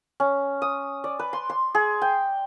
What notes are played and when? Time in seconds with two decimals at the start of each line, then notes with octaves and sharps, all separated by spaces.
0.20 C#4
0.62 D#6
1.04 D5
1.19 B4
1.33 C6
1.50 C6
1.75 G#4
2.02 G5